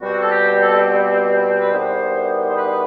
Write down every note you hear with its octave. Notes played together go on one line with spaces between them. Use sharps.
B2 G3 C4 F#4
A4
G4
A4
B4
E2 D#3 G3 B3 C5
C5
B4